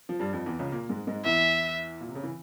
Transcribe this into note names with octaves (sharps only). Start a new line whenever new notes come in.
F3
G2 G3
F2 F3
E2 E3
C#2 C#3
A#2 A#3
G#2 G#3
G#2 G#3
E2 E3 E5
A#2
C3
C#3
E3